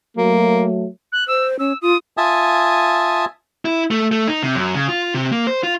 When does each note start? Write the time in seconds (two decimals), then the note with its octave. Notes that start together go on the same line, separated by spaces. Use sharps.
0.17 F#3 A3 A#3
1.12 F#6
1.28 C5 E6
1.59 C#4 E6
1.82 F4 D#6
2.17 F4 E5 G#5 A5 D#6
3.65 E4
3.91 A3
4.11 A3
4.28 D#4
4.43 C3
4.56 F#2
4.75 C#3
4.89 F4
5.14 C3
5.32 A#3
5.47 C5
5.63 F4